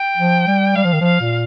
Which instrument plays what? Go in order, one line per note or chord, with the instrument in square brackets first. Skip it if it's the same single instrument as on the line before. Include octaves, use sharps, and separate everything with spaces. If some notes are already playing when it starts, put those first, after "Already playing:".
Already playing: [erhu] G5
[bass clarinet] F3
G3
[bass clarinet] G3 [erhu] F5
[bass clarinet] F3
D#3
[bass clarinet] F3 [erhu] F5
[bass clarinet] A#2